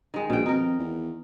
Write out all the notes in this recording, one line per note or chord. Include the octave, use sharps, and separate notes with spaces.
D#3 G#3
A#1 B2 G5
F2 D#4 A#4
E2